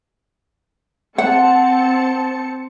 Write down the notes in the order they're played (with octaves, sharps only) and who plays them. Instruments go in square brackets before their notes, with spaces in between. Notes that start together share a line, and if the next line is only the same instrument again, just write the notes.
[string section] C4 A5 C#7 [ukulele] F#5